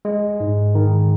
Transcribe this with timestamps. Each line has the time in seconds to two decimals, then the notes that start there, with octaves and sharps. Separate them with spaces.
0.05 G#3
0.40 G#2
0.75 D#3